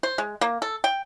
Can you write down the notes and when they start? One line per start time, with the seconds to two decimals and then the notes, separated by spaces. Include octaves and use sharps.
0.03 C5
0.18 G#3
0.41 A#3
0.62 A4
0.84 G5